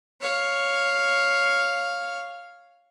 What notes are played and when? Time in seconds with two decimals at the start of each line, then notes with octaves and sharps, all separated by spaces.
0.21 C#5 F5